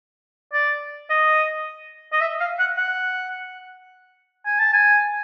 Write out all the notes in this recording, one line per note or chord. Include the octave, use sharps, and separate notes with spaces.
D5
D#5
D#5
E5
F5
F#5
F#5
G#5
A5
G#5